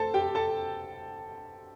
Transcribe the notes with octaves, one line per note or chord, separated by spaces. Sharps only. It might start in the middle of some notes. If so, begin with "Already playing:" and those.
Already playing: A4 C5 A5
G4 G5
A4 A5